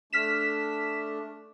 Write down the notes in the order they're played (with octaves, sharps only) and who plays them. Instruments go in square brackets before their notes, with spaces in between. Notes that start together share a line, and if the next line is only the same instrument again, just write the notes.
[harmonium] A3 D4 [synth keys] F6 B6 E7